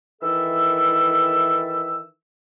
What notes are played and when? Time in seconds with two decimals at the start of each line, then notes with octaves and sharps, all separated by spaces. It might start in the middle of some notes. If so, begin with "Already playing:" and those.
0.21 D#3 E3 A4 E5 E6